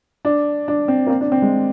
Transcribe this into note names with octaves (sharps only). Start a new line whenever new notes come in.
D4
D4
C4
A#3
C4
D4
C4
G#3